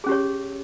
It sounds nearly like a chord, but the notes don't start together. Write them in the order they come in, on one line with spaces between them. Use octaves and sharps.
G#4 C#4 G4 C#5